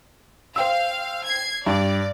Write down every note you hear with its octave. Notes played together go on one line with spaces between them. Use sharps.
C5 F5 G5 E6
G#6 C7
G2 D5